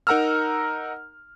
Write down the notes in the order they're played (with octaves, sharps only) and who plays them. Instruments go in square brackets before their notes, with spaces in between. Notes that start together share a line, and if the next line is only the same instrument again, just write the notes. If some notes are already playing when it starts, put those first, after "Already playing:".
[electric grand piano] D#4 A#4 F#5 A#5 E6 F6